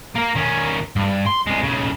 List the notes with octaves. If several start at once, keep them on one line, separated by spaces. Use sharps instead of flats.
A#3 A#4
D#3 C#4
G2
C6
C2 G#3
B1 C#3